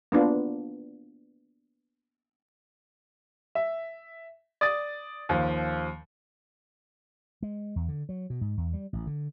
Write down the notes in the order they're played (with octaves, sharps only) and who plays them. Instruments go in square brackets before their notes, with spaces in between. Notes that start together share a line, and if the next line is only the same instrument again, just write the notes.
[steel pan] A#3 B3 D4 F4
[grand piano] E5
D5 D#6 A6
D#2 F3
[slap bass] G#3
E2
D3
F#3
B2
G#2
E2
G3
A1
D3